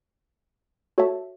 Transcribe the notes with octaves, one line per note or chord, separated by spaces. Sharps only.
F#4 A4 C#5 E5 A5